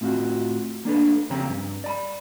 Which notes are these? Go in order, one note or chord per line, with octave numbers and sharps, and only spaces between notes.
A2 C4 F4 F#4
A#3 D4 A4 B4
F2 C#3 C4 C#4 G4 A#5
G2
D5 A#5 B5